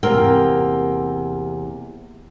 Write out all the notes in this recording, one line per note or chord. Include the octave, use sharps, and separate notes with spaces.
E2 C3 A#3 A#4 G5